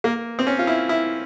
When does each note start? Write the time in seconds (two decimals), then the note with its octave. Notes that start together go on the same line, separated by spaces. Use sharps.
0.04 A#3
0.39 C4
0.47 C#4
0.59 F4
0.67 E4
0.89 E4